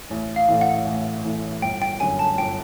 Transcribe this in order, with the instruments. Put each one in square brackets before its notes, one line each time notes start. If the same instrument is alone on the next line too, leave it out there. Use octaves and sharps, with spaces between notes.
[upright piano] A1
[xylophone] F5
[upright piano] A2 E3
[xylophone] F#5
[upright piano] A1
A2 E3
[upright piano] G1 [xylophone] G5
[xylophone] G5
[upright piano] F#2 D3 [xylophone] G#5
[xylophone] A5
[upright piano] G1 [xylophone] G5